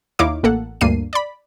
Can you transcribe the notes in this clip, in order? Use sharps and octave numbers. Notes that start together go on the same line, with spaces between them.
D#2 D#4 E4 C#5 F5 D6
A1 A#3 A4 F#5
D2 G2 A#3 D4 C7 D#7
D5 B5